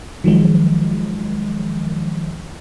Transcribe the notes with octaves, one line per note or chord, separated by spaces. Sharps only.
D#3 F3 F#3 G#3